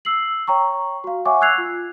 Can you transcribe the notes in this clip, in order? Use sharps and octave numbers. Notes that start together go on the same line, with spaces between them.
E6 C7 F#7
C#5 G5 A#5 C#6
F#4 F5
C#5 E5 F#5 G#5 C#6 D6
E6 F#6 G#6 C7 F7
F4